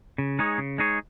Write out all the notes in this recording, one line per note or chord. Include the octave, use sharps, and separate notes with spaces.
C#3
G#3 D#4 G#4 C#5
C#3
G#3 D#4 G#4 C#5